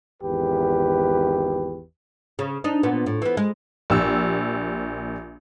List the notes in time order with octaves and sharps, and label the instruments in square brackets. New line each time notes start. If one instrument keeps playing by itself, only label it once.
[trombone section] G#1 E2 G4 B4
[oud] C#3
D4 D#4
A#2 B3
A2
E3 B3
G#3
[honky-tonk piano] A#1 G4 E6